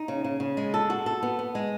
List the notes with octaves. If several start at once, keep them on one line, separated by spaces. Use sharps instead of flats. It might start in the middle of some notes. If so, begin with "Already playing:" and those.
Already playing: D#4
C#3
C#3
C#3
G#3
A4
F#4
A4
B3
B3
G#3